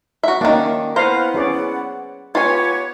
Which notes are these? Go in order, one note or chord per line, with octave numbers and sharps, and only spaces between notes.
F#4 E5
D#3 A#3 C#4 D4
B3 E4 B4 C5 F5 F#5 A#5
C#4 G#4 D5
B3 F4 G4 C#5 G#5